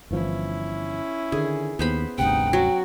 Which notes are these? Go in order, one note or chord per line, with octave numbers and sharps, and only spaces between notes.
G1 E3 F3 C#4 E4
D3 D#3 G#4
D#2 B3 C5 B5
G1 D2 C3 D#4 F#5 G5
F#3 C#4 F#4